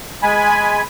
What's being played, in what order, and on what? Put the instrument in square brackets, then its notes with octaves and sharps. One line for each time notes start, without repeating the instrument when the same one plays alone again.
[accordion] G#3 G#5 B5